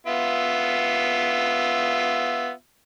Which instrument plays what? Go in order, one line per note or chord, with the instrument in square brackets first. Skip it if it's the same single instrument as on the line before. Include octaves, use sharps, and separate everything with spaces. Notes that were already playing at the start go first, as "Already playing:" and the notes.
[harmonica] B3 F4 E5